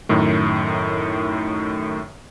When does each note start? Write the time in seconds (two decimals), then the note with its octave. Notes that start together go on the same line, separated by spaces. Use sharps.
0.09 F#2 A2 D#3